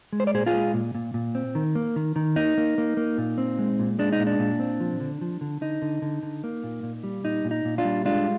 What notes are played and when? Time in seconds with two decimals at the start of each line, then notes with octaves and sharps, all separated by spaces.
0.13 G#3
0.20 C5
0.27 D5
0.34 A#2 G#4 C5
0.46 F4 G#4
0.53 G#3
0.74 A#2
0.95 A#2
1.14 A#2
1.35 C4
1.55 D#3
1.75 A#3
1.96 D#3
2.16 D#3
2.36 A#3 D#4
2.58 A#3
2.78 A#3
2.97 A#3
3.18 A#2
3.38 C4
3.59 G#3
3.79 A#2
3.99 G#3 D4
4.13 D#4
4.19 A#2
4.27 D4
4.39 A#2
4.60 C4
4.80 F3
5.00 D3
5.21 F3
5.41 D3
5.61 D3 D#4
5.82 D3
6.02 D3
6.23 D3
6.44 A#3
6.64 A#2
6.83 A#2
7.04 G3
7.24 A#2 D#4
7.45 A#2
7.51 D#4
7.65 A#2
7.78 D4 F4
7.85 G3
8.05 G#3 D4 F4